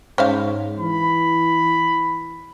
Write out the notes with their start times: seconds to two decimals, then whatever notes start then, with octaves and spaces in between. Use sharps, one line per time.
0.18 G#2 C#4 C5 F5
0.79 E3 B5